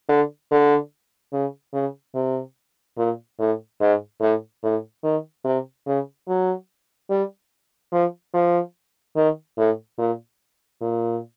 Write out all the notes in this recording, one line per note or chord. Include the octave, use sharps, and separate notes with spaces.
D3
D3
C#3
C#3
C3
A#2
A2
G#2
A2
A2
D#3
C3
C#3
F#3
G3
F3
F3
D#3
A2
A#2
A#2